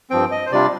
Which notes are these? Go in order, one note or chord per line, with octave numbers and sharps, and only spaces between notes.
G2 F3 C4 G5
D#5
C5
C3 G3 D4 F4 D5